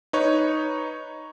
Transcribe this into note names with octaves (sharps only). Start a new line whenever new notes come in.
D#4 B4 C#5